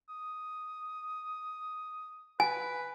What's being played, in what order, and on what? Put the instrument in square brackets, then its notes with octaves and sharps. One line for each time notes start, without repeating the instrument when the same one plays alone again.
[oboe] D#6
[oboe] B4 [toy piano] G#5